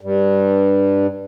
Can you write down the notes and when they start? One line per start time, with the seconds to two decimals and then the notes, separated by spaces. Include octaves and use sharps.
0.01 G2